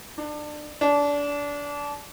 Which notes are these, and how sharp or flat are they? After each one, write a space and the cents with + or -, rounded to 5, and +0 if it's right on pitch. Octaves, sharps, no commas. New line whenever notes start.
D4 +25
D4 -25